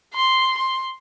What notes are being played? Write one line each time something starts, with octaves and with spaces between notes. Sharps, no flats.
C6
C6